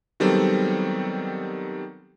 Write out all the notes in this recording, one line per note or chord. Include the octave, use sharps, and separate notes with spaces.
D#3 F#3 G3 B3 C4 A4